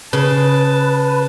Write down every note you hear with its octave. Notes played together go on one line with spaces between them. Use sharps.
C#3 B4 A5